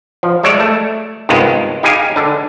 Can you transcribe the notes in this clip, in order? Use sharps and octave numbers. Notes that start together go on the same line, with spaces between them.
F3
G3 G#3 C#5 D5 E5
A3
G2 C3 D#3 G#3 B3 F4
D#4 G4 G#4 F5 G#5
D3 D4